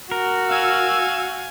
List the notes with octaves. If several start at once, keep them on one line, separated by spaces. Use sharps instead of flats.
F#4 A#4
F5 G#5 E6